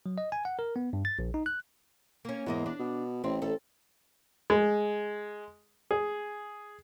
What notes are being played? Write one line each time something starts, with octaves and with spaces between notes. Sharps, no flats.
F#3
D#5
G#5
F#5
A#4
B3
G2
A6
A#1
D#4
F#6
A#3 C#4
E2 G#2 A#3 D#5
D4
B2
A1 C4
A1 A4
G#3
G#4